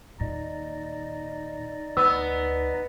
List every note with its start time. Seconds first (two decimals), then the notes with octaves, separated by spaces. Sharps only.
0.20 D#2 A#2 D#4 D5 D#5
1.97 D2 B3 E6